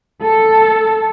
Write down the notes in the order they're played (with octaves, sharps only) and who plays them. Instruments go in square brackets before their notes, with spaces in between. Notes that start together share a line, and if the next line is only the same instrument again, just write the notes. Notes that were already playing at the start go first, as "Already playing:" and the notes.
[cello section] A4